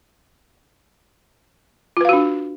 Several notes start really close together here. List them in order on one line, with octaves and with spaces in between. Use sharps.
F4 B4 F5 F#4 D4